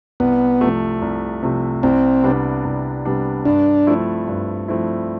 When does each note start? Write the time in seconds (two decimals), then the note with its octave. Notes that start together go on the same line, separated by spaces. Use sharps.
0.20 C2 B3
0.61 C3 F3 A3
1.02 C2
1.43 C3 F3 A3
1.83 C2 C4
2.23 C3 G3 B3 D4
2.65 C2
3.05 C3 G3 B3 D4
3.45 G2 D4
3.87 F3 A3 C4 E4
4.28 G2
4.68 F3 A3 C4 E4